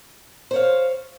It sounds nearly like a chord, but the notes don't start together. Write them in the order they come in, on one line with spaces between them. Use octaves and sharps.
C5 C#5 F5